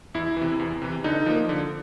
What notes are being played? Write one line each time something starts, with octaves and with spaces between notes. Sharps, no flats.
E2 E4
C3 E3
E2
C3 E3
D3 D#4
F3 A#3
D3